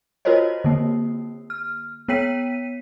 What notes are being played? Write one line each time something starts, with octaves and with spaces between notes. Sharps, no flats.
F4 F#4 A#4 C5 C#5 D#5
D3 A#3
F6
B3 C#5 G5 B6 D#7